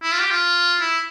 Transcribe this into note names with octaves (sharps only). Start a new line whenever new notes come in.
E4
F4
G4
F4
E4